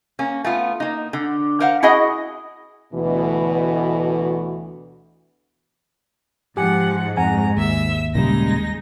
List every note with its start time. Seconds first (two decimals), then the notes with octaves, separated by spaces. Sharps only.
0.19 A#3 C#4
0.44 A3 B3 F4
0.80 A#3 D#4
1.13 D3
1.60 A#4 C5 F5 F#5
1.83 E4 F#4 G#4 D#5 F#5
2.93 D2 B2 E3
6.57 G#2 F3 G4 F#5 G#5
7.17 F2 F#5 G#5 A#5
7.56 G#1 D#2 E5 E6
8.15 A#2 C#3 G3 G#3 D#4 A#6